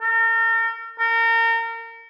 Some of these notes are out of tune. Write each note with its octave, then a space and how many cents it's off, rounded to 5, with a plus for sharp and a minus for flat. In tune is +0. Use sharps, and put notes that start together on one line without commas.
A#4 -40
A#4 -30